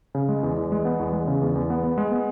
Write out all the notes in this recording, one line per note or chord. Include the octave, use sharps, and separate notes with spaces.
C#3
G#3
E2
E2
G#3
B3
E2
G#3
C#3
E2
E2
B3
B3
G#3
B3